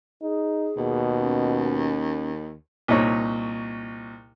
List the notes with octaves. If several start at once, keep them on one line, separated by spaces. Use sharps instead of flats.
D#4 G#4
D#2 B2
C#4
C2 A#2 D#4 C#5